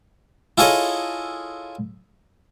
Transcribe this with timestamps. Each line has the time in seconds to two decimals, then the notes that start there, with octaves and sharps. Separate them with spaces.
0.58 E4 F4 G#4 A4 C#5 D#5